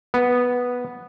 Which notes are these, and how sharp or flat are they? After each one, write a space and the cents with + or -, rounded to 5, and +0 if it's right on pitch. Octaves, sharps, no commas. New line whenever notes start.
B3 -5